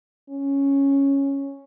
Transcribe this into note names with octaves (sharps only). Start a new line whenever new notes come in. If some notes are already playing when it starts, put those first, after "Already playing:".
C#4